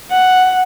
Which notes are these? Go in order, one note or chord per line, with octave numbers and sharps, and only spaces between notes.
F#5